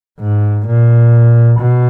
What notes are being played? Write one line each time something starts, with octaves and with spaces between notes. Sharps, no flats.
G#2
A#2
B2